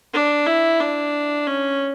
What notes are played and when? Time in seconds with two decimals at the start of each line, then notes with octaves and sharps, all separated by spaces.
0.13 D4
0.46 E4
0.80 D4
1.47 C#4